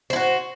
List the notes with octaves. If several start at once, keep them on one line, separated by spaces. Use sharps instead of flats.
E4 F#4 C5